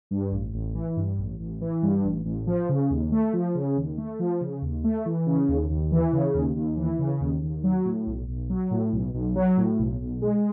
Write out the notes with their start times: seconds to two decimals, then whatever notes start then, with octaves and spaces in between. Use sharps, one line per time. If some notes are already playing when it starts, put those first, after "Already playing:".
0.11 G2
0.32 A1
0.54 A1
0.75 E3
0.97 G2
1.18 A1
1.40 A1
1.61 E3
1.83 G2
2.04 A1
2.25 A1
2.47 F3
2.69 C#3
2.90 D#2
3.12 A3
3.33 F3
3.55 C#3
3.77 D#2
3.98 A3
4.20 F3
4.41 C#3
4.62 D#2
4.84 A3
5.06 E3
5.26 C#3
5.48 D#2
5.70 D#2
5.92 E3
6.13 C#3
6.34 D#2
6.56 D#2
6.77 E3
6.99 C#3
7.21 D#2
7.42 D#2
7.64 F#3
7.85 A2
8.06 B1
8.28 B1
8.50 F#3
8.71 A2
8.92 B1
9.14 B1
9.35 F#3
9.57 A2
9.79 B1
10.00 B1
10.22 G#3